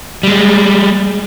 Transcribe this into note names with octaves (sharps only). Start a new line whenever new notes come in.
G3 G#3